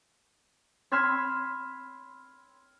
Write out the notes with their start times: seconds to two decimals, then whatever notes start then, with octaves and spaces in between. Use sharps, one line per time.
0.92 B5 C6 E6 F6 G#6 B6